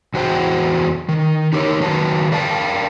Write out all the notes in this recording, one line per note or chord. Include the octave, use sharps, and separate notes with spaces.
E2 F#4 C5 F#5 G5
D#3
D#4 G4 A#4 C#5
D#3 F#3 B4 A5
A#4 D5 F5 G5 A5